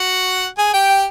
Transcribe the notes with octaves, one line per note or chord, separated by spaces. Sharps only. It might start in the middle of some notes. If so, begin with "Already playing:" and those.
Already playing: F#4 F#5
G#4 G#5
G4 G5